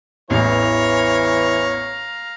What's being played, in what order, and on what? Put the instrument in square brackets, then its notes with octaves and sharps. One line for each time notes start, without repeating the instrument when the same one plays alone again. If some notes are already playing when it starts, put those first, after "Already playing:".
[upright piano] A1 E2 [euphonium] E3 [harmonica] C#5 [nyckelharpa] F5 A#5